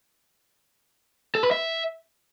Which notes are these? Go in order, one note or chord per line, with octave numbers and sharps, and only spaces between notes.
A4
B4
E5